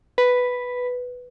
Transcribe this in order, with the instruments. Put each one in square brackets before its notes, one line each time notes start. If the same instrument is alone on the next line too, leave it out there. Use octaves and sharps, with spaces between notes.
[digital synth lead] B4